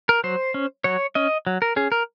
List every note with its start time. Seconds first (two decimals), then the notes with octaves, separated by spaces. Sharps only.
0.09 A#4
0.24 F#3 C5
0.54 C#4
0.84 F#3 C#5
1.15 C#4 D#5
1.47 F#3
1.62 A#4
1.76 C#4 G#4
1.92 A#4